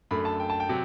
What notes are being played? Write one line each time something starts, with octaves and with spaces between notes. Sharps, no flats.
F#2 D3 A3 B5
A5
G5
A5
G5
C3 F#3